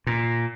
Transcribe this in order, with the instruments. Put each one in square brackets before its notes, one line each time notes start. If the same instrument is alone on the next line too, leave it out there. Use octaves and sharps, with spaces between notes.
[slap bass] A#2